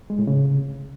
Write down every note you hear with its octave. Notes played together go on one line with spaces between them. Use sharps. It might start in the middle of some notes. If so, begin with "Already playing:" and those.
G#3
A2
C#3